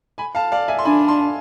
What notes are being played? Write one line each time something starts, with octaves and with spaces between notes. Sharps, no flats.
G#5 B5
F5 A5
D5 F5
E5 G#5
C6
D4 G#5 B5
A5 C6